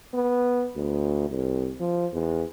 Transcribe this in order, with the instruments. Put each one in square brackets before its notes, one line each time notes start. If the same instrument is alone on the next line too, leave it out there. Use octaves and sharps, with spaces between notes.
[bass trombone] B3
D2
C2
F3
E2